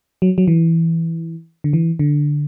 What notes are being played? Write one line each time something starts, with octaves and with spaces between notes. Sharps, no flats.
F#3
F#3
E3
D3
E3
D3